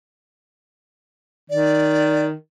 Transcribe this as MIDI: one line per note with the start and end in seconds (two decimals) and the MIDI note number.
1.50 2.33 51
1.50 2.25 74